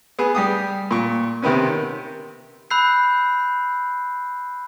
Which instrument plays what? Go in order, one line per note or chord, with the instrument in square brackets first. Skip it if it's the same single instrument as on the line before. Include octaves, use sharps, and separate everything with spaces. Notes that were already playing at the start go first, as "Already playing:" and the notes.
[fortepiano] B3 G#4
G3 G4 D#6
A#2 C#6
C3 D#3 B3 C#4
[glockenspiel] B5 E6 F#6 G6 C7